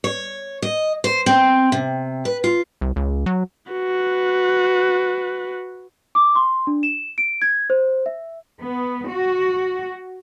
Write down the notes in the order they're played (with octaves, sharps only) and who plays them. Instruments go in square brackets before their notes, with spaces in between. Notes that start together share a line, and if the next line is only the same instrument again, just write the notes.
[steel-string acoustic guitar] C#5
D#5
C5
C4
C3
B4
F4
[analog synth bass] C2
C#2
F#3
[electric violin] F#4 B4
[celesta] D6
C6
D4
E7
D7
G#6
C5
E5
[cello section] B3
F#4